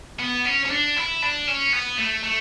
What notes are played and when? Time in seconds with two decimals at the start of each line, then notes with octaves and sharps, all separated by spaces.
0.19 B3
0.45 C#4
0.65 C#4
0.71 D4
0.96 E4
1.22 D4
1.47 C#4
1.73 B3
1.98 A3
2.23 A3